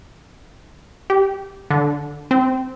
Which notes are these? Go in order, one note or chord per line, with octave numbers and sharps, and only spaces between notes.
G4
D3
C4